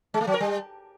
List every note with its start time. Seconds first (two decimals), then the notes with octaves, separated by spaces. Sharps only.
0.14 G#3
0.21 A3
0.27 F#3
0.34 A#4
0.40 G3